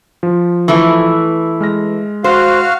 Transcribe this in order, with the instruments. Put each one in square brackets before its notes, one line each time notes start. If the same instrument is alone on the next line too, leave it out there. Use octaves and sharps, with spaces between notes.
[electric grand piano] F3
[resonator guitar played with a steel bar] E3 A3
[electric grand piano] G#3 F6 A#6
[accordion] F#4 F5 [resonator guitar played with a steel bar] C5